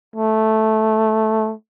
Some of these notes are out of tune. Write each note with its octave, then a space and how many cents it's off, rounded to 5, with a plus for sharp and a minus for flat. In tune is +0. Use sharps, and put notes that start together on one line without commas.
A3 -5